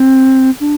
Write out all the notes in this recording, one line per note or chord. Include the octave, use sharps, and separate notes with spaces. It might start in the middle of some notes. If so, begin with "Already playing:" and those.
Already playing: C4
D4